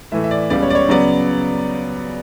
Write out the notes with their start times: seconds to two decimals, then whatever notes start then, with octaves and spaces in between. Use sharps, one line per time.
0.12 A2 E3 A3 E5
0.24 E5
0.31 D5
0.50 C#2 C#3 G3 B3 D5
0.63 C#5
0.70 D5
0.75 C#5
0.89 C#3 F#3 B3 D5